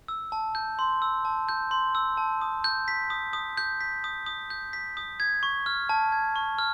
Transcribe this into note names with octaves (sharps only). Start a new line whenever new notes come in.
E6
A5
G6
C6
E6
A5
G6
C6
E6
A5
D#6
G6
B6
D#6
D#6
G6
B6
D#6
D#6
G6
B6
D#6
G#6
C#6
F6
A5
G#6
C#6
F6